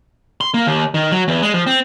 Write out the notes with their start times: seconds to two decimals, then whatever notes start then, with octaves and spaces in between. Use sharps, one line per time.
0.41 C6
0.54 A#3
0.66 D#2
0.94 D#3
1.12 F#3
1.28 E2
1.42 G#3
1.54 F3
1.67 C4